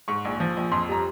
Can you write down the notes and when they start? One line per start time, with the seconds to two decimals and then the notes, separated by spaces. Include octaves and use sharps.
0.08 G#2 C#6
0.25 A#1
0.40 F3
0.57 A#1
0.72 F2 C6
0.89 G3 A#5